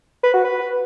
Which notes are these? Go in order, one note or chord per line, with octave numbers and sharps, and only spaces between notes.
B4
F#4
B4